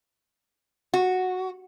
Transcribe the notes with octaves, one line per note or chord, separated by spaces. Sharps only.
F#4